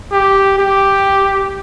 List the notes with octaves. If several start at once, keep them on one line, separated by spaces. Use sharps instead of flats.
G4
G4